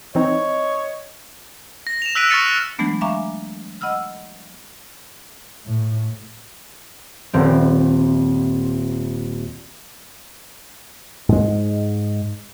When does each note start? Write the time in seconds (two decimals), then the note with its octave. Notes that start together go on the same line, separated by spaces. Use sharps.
0.15 E3 C4 D#4 C#5 D#5
1.87 A#6
2.02 E7 F7
2.15 E6 F#6 B6 D7 D#7
2.29 C#6 F6 A6 C#7 D#7
2.79 E3 F#3 G#3 A3 B3 D4
3.01 E5 F5 G#5 A#5 C#6 D6
3.81 D#5 F#5 B5 E6 F6
5.66 A2
7.33 D#1 C4
11.29 G#2 G#3